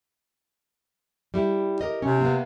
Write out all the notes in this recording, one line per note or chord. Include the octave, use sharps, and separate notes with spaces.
G3 E4 G4
G4 A#4 D#5
C3 C#4
A#3 B3